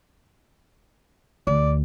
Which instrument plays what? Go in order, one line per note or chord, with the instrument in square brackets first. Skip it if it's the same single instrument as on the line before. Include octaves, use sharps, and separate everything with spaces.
[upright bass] D2 [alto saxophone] D5